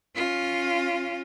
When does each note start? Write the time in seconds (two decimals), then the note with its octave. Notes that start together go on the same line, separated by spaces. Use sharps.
0.15 C#4 F4